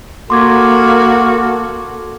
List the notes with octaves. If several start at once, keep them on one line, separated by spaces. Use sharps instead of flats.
A#3 F#4 A4 C6 D6 G#6